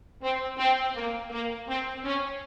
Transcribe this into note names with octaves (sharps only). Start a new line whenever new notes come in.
C4
C4
A#3
A#3
C4
C#4